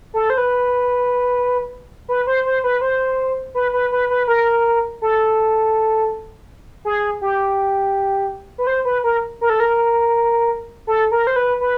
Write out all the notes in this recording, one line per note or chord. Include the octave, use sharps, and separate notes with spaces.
A4
C5
B4
B4
C5
C5
B4
C5
B4
B4
B4
B4
A#4
A4
G#4
G4
B4
C5
B4
A#4
A#4
A4
A#4
A4
A#4
C5
B4
B4